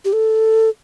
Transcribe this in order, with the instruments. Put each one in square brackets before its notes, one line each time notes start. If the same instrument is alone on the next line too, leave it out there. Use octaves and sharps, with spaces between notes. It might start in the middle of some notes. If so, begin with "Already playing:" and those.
[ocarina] G4
A4